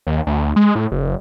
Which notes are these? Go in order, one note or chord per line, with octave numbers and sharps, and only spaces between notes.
D#2
D2
G#3
A2
F#1